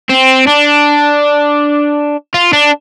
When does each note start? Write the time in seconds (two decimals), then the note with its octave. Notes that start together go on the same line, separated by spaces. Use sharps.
0.10 C4
0.47 D4
2.34 F4
2.53 D4